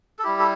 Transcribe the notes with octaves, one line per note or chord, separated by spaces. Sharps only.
A4
G3 E4 G4
A4